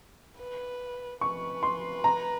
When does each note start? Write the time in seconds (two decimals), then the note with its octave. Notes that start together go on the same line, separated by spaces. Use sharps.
0.39 B4
1.21 B4 C#6
1.63 C6
2.04 A#5